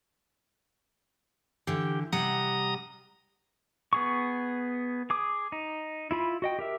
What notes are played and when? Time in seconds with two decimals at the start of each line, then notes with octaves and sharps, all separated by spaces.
1.67 D3 E3 G4
2.12 C3 G3 F#5 A#5 D#6
3.93 B3 G#4 C#6
5.10 G#4 D6 D#6
5.52 D#4
6.11 E4 F4 B5
6.42 F#4 D#5 G5
6.59 G4 A#4 E5